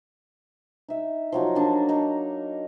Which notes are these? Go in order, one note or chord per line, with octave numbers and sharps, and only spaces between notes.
D#4 E5
F3 F#3 D#4
A#3 D4 D#4
D#4 A#4